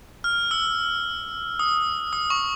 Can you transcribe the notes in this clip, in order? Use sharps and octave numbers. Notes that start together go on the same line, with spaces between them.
F6
E6
D#6
D#6
C#6